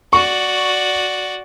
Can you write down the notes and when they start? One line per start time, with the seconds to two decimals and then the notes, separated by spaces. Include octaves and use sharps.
0.13 F#4 D5 C#6